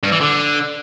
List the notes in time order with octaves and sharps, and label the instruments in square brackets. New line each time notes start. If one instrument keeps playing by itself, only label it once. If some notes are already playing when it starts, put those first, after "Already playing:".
[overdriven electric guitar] G2
E3
D3